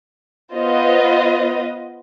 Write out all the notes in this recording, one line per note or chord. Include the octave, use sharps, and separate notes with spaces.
B3 F4 B4 C5 D#5